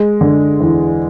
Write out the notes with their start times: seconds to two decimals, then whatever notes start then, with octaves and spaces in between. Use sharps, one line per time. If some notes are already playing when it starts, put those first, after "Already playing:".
Already playing: G#3
0.21 D3
0.61 E2